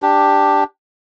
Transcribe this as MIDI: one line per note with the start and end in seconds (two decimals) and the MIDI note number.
0.02 0.64 62
0.02 0.64 67